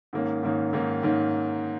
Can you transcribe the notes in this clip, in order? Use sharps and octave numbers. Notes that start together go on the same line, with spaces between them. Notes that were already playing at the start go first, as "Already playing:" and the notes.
G#2 D#3 A#3 C#4
G#2 D#3 A#3 C#4
G#2 D#3 A#3 C#4
G#2 D#3 A#3 C#4